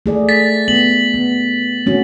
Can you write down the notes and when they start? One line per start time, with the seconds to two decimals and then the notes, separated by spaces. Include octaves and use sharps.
0.06 A3 G#4 D5
0.29 A6 B6
0.68 B3 F#7
1.14 B3
1.86 A3 C#4 F#4